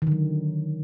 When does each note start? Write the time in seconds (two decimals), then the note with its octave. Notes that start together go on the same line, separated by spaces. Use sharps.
0.02 D#3
0.07 D3
0.12 F#3